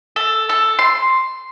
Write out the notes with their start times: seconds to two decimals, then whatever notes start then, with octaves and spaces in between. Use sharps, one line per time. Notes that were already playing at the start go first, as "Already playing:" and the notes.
0.16 A4
0.49 A4
0.79 C6